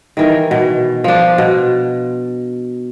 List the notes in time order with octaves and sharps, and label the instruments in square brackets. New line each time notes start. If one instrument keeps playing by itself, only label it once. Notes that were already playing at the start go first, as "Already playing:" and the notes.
[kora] D#3 E3 A#4
B2
F3 D4
B2